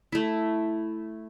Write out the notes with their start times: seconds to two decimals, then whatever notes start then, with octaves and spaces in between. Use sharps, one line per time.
0.12 A3 E4